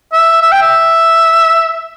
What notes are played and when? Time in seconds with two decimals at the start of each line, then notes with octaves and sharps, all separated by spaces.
0.12 E5
0.42 E5
0.52 G5
0.62 E5